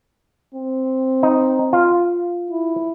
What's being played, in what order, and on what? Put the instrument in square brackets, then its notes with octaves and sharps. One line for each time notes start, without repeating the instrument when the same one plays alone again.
[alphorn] C4
[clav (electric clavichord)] D#4
F4
[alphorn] E4